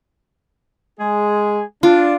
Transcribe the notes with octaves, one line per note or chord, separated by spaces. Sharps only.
G#3 G#4
D4 F4